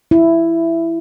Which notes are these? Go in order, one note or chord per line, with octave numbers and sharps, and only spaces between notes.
E4